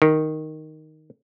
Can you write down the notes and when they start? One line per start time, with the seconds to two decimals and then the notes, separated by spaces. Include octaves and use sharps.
0.02 D#3